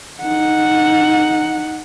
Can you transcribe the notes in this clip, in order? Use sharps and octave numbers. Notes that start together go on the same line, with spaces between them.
D#4 F#5